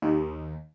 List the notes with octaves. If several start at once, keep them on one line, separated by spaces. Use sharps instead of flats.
D#2